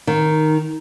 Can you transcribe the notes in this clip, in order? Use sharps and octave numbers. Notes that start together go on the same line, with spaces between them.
D#3